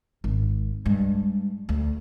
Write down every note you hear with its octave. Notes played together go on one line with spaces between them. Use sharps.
G#1
G2 G#3
D2